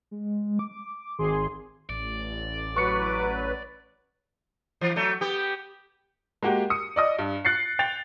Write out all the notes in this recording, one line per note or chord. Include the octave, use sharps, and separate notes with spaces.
G#3
D6
G#1 G#4 C6
A1 D5
F#3 B4 C#6 C#7
E3
F#3 A3
B3 G4
G#3 A#3 F#4 G4
D#6 C#7
D5 D#5 D#6
G2
F#6 A6 C7 C#7
G5 A6 F7